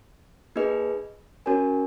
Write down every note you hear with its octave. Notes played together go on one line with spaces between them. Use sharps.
A#3 D#4 G#4 B4 D#5
C#4 F#4 A#4 C#5 G#5